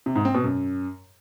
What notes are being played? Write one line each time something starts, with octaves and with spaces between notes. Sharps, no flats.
C3
G#2
C4
B2
F#2